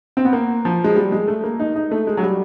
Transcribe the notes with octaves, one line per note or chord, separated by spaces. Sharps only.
C4
B3
A#3
F3
G#3
G3
G#3
A3
A#3
D#4
D#4
A3
G#3
F#3
G3